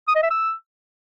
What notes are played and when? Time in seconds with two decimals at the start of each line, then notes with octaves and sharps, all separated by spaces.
0.08 D#6
0.16 D#5
0.23 E5
0.31 E6